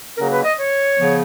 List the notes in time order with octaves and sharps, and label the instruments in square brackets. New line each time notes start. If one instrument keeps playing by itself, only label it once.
[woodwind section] C#3 F#3 A#3 C#4 A#4
B4
D#5
C#5
C#3 F3 B3